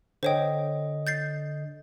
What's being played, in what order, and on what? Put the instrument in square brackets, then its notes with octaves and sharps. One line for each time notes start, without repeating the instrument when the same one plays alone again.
[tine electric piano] D3 D#5 [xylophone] C5 C#5 G5
[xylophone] G6 A6 C7